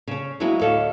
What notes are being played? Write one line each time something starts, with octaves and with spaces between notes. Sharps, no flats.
C#3 C#4
F#3 G#3 A#3 B3 E4 F#4
D2 A2 A4 C#5 D#5 F5